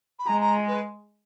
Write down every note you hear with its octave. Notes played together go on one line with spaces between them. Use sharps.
B5
G#3 A#5
A#5
B4